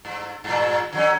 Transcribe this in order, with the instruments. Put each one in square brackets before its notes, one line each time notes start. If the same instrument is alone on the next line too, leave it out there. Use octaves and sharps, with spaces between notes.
[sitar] G2
G2 A#2
D3 F#3 C#4